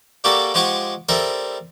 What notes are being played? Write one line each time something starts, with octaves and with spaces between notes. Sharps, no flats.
G3 A#3 F#4 G4 A4 D5
F3 G#3 G4 F#5 C#6 D6
G3 C4 A4 A#4 E5 A5